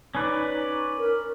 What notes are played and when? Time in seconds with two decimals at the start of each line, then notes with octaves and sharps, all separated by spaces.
0.15 C#4 D#4 B4 D5
0.98 A#4